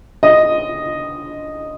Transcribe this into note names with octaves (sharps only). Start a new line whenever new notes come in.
D#5